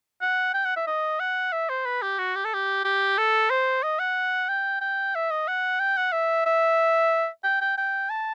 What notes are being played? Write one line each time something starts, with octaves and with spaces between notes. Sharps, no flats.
F#5
G5
F#5
E5
D#5
F#5
E5
C5
B4
G4
F#4
G4
A4
G4
G4
A4
C5
D#5
F#5
G5
G5
E5
D#5
F#5
G5
F#5
E5
E5
G5
G5
G5
A5